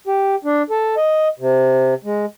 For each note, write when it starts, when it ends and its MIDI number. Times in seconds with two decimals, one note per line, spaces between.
0.07 0.35 67
0.45 0.62 62
0.70 0.95 69
0.97 1.28 75
1.39 1.94 48
2.04 2.25 56